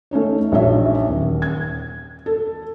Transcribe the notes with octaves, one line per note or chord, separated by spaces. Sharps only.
A3 C#4 D#4 C#5
A#1 F#3 D#4 C#5 E5
D#1
G#6
A4